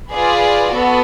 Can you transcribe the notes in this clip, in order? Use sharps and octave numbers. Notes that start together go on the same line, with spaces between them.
F4 G#4 B4 D5
B3 F#4 A4